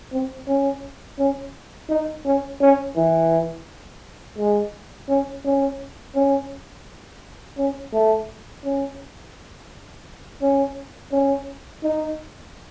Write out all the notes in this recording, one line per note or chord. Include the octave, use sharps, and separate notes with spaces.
C4
C#4
C#4
D#4
C#4
C#4
E3
G#3
C#4
C#4
C#4
C#4
A3
C#4
C#4
C#4
D#4